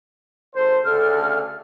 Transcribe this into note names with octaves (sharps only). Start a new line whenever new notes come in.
G#1 A4 C5
D2 C#3 A4 F6